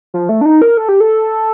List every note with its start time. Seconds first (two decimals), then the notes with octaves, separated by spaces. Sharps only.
0.14 F3
0.29 A3
0.41 D4
0.45 D#4
0.62 A#4
0.77 A4
0.89 G4
1.00 A4